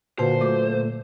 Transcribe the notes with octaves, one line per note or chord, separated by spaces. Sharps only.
A#2 D3 F#4 B4 C5 A5
F#3 A3 F#4 D6